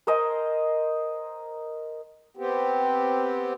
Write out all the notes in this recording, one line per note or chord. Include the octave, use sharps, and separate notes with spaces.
A#4 C5 D#5 G#5
B3 C4 G4